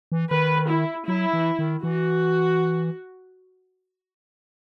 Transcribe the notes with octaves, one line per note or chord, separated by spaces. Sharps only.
E3
D#3 B4
E4
F#3 E4
E3
D#3
E3 F#4